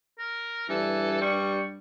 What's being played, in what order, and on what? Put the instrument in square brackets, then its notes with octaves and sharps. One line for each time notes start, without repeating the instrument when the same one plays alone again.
[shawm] A#4
[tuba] G2 [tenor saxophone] E3 [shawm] A4
[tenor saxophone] G3 [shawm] C#6